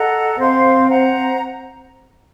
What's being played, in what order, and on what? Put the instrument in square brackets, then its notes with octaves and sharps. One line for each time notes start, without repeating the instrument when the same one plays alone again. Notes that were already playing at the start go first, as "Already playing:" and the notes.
Already playing: [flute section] A4 D#5 F#5 A#5
[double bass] C4 [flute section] C5 F5 C6
[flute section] C5 F#5 A#5